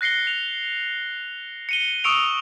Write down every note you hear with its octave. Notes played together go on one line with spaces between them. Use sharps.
F#6 A#6 C7 C#7 G7
F7
C#7 D#7 G7
C#6 D#6 E6 C#7 D7 F7